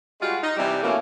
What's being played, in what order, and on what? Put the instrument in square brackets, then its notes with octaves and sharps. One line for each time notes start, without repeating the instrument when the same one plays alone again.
[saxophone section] G3 G#3 F4 F#4
D#4
C3 E3 G3
B2 E3 A3 A#3 C#4